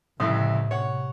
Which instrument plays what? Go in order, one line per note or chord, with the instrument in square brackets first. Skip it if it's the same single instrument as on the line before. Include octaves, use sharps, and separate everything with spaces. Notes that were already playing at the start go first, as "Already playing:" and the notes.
[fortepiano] C2 F2 E4 [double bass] A2 C#3 [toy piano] E5 C6 D#6
[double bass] C3 [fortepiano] C#5 F#5